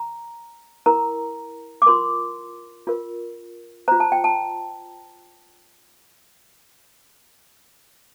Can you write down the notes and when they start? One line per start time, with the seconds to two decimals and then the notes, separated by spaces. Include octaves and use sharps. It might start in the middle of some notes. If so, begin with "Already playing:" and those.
Already playing: A#5
0.86 E4 A#4 A#5
1.82 D6
1.86 F4 A#4 C6
2.87 F4 A#4
3.88 F4 C5 A#5
4.00 A5
4.12 G5
4.24 A5